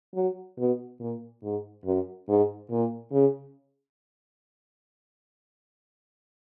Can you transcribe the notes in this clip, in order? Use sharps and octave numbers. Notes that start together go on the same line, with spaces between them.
F#3
B2
A#2
G#2
F#2
G#2
A#2
C#3